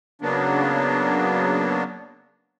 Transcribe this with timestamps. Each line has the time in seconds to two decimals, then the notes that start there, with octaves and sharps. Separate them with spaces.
0.22 C#3 F#3 A#3 B3 D4